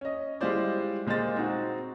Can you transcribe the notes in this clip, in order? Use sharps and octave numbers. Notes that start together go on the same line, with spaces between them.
C#4 D#5
G3 G#3 E4 F4 C5 D5
A#2 G#3 C5 D#5 A6
C4 D#4 F#4